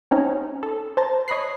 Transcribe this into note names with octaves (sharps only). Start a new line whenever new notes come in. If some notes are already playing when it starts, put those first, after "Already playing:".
C4 C#4 D#4
A4
C5 A5 A#5
C#5 D#5 B5 F#6 C7